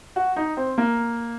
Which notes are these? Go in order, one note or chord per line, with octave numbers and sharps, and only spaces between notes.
F#4
D#4
C4
A#3